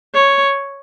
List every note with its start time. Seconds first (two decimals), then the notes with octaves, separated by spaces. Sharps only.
0.15 C#5